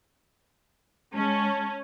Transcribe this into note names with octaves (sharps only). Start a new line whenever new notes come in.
G#3 C#4 A5